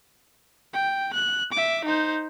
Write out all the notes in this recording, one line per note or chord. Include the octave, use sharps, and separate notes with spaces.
G5
F#6
E5 D6
D#4 C5